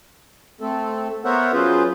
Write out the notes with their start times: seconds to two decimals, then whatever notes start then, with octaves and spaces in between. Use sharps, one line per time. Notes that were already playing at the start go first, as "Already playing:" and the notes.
0.61 A3 C4 A4
1.25 B3 A#4 C5 C#5 E5 F#5
1.53 F#3 C#4 F4 G#4 B4 C5